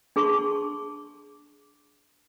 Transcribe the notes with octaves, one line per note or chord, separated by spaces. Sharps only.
D4 G#4 A5 C6 C#6